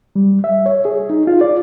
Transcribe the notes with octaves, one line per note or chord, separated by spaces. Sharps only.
G3
E5
C#5
G#4
D#4
F4
D5